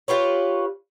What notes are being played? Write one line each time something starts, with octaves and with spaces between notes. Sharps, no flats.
F4 G4 B4 C#5